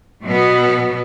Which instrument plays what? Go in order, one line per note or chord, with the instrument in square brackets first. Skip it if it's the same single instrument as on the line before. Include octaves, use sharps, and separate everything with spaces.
[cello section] B2 F#3 B3